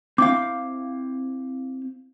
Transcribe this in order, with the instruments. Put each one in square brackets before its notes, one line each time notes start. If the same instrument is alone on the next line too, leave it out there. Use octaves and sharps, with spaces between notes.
[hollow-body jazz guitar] C4 E4 F5 [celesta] D6